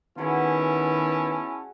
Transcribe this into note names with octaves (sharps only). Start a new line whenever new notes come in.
D#3 G#3 B3 C#4 E4 F#4 F#5 A5